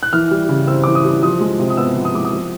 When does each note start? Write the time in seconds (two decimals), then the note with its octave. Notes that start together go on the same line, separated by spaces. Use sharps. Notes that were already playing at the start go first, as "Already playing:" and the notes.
0.03 F#6
0.13 E3 F6
0.31 G3
0.49 C#3
0.67 C4 E6
0.84 E3 D6
0.95 D#6
1.05 G3
1.23 F3 D#6
1.41 G#3
1.59 C3
1.70 D#6
1.77 B3 E6
1.96 F3
2.05 D#6
2.14 G#3 D6
2.25 D#6
2.33 F3